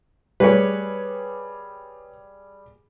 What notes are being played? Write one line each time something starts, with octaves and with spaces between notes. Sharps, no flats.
G3 G4 G#4 B4 C#5